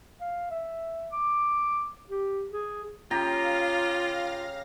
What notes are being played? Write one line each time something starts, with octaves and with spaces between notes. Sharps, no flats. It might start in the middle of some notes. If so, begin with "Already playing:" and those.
F5
E5
D6
G4
G#4
C#3 F4 G4 F5 A#5 A#6